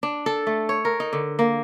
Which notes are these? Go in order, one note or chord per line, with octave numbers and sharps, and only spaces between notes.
D4
A4
A3
C#5
A#4
D#4
D3
A#3